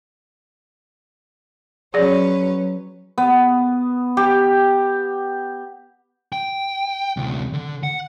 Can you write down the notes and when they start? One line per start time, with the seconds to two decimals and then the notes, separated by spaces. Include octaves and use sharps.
1.94 F#3 C#4 G#4 B4 D5
3.18 B3
4.17 G4
6.33 G5
7.17 D2 C3
7.53 D3
7.83 F#5